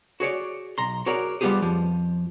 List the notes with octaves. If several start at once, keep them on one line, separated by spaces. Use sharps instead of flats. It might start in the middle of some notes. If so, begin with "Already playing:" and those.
F#4 G#4 C#5 D5
B1 A#5 C6
F#4 G#4 A#4 C#5 D5
G3 B3 C#4 F4 G4 G#4
F2 F3